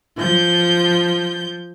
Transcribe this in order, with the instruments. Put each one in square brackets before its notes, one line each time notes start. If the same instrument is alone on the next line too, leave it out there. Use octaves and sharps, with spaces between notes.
[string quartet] F3 G6